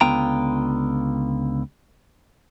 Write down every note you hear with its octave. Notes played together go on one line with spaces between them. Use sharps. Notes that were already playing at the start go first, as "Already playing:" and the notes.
C#2 D3 B3 F4 G5 A#5